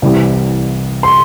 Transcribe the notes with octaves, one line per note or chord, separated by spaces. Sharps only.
C2 C3 E3 G3
C6